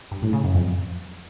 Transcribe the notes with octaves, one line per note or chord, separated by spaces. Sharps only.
G2
A2
C#3
F#2
F2